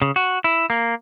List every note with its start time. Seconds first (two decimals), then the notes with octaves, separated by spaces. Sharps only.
0.02 C#3
0.16 F#4
0.44 E4
0.70 A#3